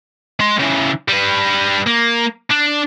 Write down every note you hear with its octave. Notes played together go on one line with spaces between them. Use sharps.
G#3 C6
C#3 E3
G3 B4
A#3
D4